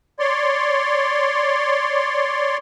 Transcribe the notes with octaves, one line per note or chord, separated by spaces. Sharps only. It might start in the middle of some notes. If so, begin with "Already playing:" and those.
C#5 D5 C6